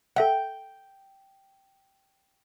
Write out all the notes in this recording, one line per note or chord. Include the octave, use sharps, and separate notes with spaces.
A4 E5 F#5 G5